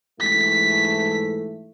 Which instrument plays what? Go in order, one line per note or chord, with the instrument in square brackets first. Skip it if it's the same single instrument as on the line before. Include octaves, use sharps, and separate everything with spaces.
[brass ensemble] G#2 E3 A3 [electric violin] B6